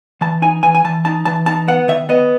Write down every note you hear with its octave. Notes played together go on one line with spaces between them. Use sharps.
E3 A5
D#4 G#5
E3 G#5
G#5
E3 A5
D#4 A5
E3 A5
D#4 A5
B3 F#5
D#3 E5
B3 D#5